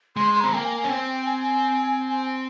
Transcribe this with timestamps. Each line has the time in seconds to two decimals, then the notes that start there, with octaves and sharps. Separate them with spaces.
0.16 G#3 C6
0.35 C6
0.40 C4 A#5
0.53 A#3 G5
0.65 G#5
0.81 G#5
0.84 C#4
0.89 C4 G5
1.25 G#5